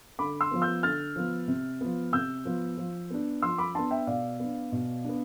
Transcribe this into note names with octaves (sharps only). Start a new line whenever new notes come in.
D3 B5 D6
C6 E6
F3 B3
E6 G6
D3 F6 A6
F3 B3
C3
F3 B3
C3 E6 G6
F3 B3
F3
B3 D4
F3 C6 E6
B5 D6
B3 D4 A5 C6
E5 G5
B2 D5 F5
B3 D4
B2
B3 D4